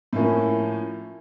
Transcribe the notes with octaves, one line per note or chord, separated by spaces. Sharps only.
A2 F3 A#3 C#4